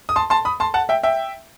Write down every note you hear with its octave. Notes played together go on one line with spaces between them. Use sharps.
D#6
A5 C6
A5 C6
B5 D#6
A5 C6
F#5 A5
E5 G5
E5 G5